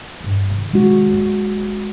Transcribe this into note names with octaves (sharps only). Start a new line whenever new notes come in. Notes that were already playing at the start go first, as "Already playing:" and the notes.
G2 E3
C3 D#3
G#3 F#4
F#1 C4